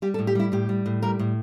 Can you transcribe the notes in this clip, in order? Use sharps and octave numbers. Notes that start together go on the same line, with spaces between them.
G3 G4
A4
A2
G4
G3 E4
A2 G4
G3
A2
G3 A#4
A2